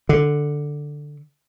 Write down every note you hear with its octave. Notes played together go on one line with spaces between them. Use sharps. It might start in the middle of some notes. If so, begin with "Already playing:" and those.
D3